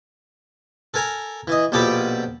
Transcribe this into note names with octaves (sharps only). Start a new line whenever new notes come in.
A4 A#4 G#5 A#5
E3 D#5
A#1 B2 G4 A4 B5 D6